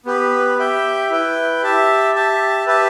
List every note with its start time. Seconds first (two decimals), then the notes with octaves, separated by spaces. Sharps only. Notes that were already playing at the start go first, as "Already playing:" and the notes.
0.06 B3 G4 B4
0.58 G4 E5 G5
1.10 E4 B4 G5
1.63 G4 E5 A5
2.15 G4 E5 A5
2.67 G4 B4 E5 A5